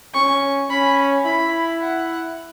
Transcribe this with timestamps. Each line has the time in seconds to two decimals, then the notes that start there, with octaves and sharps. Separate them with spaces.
0.14 C#4 C#6
0.70 C#4 B5
1.26 E4 B5
1.81 F#5